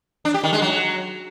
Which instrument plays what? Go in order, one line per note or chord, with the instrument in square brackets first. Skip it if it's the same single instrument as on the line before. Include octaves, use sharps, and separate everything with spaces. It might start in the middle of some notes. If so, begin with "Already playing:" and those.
[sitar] D4
G4
D#3
G#3
F#3